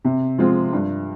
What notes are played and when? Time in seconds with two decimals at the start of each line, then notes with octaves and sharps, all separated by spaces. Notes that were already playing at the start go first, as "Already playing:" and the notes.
0.05 C3
0.38 F3 G#3 C4 F4
0.73 G2